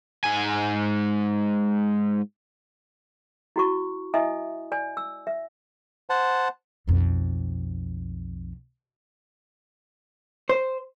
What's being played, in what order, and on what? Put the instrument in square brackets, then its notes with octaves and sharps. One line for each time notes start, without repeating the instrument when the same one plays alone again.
[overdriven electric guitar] G#2 G#5
[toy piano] E4 F#4 C#6
E4 D#5 E5 G#5 D#6
D5 G#5
E6
E5
[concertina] C5 F#5 A5
[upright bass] B1 F2
[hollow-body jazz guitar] C5